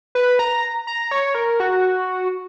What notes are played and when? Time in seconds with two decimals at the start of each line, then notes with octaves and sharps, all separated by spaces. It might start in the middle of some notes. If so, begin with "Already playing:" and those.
0.15 B4
0.39 A#5
0.87 A#5
1.11 C#5
1.35 A#4
1.60 F#4